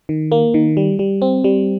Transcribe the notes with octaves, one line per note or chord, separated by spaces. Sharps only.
D#3
A#3
D#3
G3
G3
C4
G3